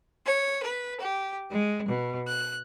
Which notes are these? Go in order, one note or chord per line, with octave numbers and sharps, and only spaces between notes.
C#5
B4
G4
G#3
B2
F#6